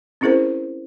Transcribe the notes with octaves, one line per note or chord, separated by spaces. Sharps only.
C4 C#4 E4 G#4 A#4 C5